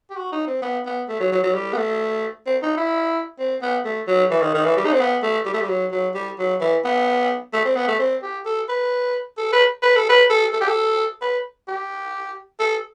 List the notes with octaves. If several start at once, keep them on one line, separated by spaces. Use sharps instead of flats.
G4
F#4
D#4
C4
B3
B3
A3
F#3
F#3
F#3
G3
B3
A3
C4
D#4
E4
C4
B3
A3
F#3
E3
D#3
D#3
E3
G3
D#4
C4
B3
A3
G3
A3
G3
F#3
F#3
G3
F#3
E3
B3
A3
C4
B3
A3
C4
G4
A4
B4
A4
B4
B4
A4
B4
A4
A4
G4
A4
B4
G4
A4